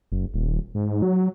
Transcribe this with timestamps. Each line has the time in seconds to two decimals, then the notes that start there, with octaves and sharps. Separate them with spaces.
0.12 F#1
0.34 D#1
0.75 G#2
1.02 F#3